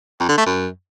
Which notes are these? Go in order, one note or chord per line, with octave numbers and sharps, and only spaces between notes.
F2
D3
A3
F#2